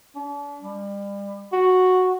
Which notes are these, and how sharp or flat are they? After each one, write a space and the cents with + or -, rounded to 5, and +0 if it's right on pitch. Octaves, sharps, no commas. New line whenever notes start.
D4 -40
G3 +35
F#4 -5